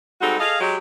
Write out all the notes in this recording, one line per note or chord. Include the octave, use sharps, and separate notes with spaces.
G3 G#3 C4 D#4 F#4 A4
G#4 A4 D#5 F5
F#3 G#3 G4